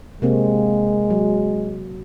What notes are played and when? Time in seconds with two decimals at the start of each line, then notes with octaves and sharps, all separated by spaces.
0.22 C3 G#3 A#3 C4
1.10 F#3